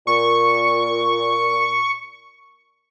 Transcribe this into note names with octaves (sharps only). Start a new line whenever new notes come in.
A#2 C#6